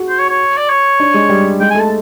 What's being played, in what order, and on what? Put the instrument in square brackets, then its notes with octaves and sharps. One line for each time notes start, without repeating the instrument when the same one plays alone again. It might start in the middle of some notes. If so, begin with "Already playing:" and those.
Already playing: [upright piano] F#4 G#4
[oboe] C5
C#5
C#5
D5
C#5
[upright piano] D4
G#3
G3
[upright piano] G#3 [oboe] G5
[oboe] G#5
[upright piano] A3
[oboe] A5